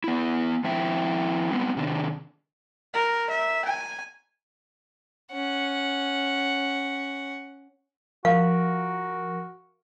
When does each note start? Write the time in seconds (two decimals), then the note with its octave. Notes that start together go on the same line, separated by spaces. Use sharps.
0.04 B3 E4
0.64 F3 C4 E4 E5 G5
1.51 G3 B3 C4
1.77 C3 D#3 D4
2.94 A#4
3.30 E5
3.65 G#5
5.32 C#4 F#5
8.25 F3 F#4 A#4 F5